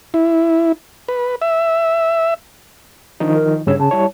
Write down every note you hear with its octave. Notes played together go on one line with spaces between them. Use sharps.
E4
B4
E5
D#3 F3 D4 D#4
A#4
G2 C#3 C#5 E6
C#3 A5
G3 E4 C#5